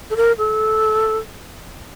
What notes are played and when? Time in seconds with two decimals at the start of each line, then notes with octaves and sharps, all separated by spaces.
0.10 A4
0.17 A#4
0.38 A4